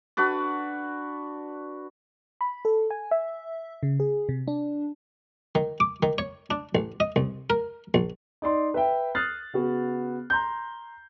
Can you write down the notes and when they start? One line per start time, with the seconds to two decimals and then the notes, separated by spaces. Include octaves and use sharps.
0.17 D4 F#4 B4 D5
2.41 B5
2.65 A4
2.90 G#5
3.11 E5
3.83 C#3
4.00 G#4
4.29 C3
4.48 D4
5.55 D#3
5.80 D6
6.03 D#3
6.18 C#5
6.51 D4
6.75 A1
7.00 D#5
7.16 C2
7.50 A#4
7.94 A#1
8.42 D#4 D5 C6
8.74 B4 E5 G5
9.15 D#6 F6 F#6 A6 C7
9.53 C#3 B3 F#4
10.30 A#5 C6 G6